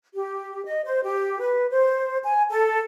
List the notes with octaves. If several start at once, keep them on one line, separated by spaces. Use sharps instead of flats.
G4
D#5
C5
G4
B4
C5
G#5
A4